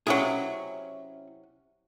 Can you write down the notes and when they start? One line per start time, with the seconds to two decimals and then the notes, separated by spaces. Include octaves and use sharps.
0.07 C3 F#3 C#4 E4 G#4